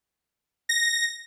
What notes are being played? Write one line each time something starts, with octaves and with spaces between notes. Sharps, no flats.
A#6